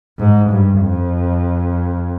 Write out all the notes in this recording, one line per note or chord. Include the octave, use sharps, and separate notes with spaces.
G#2
G2
F2